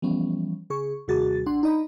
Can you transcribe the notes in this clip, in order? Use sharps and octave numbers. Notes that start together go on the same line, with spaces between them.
E3 F3 G3 B3 C#4
C#3 G#4 C#6
D#2 C3 G3 F#4 G#4 A6
A1 D4 F#5 C6
D#4 D5 D#5 A#5 B5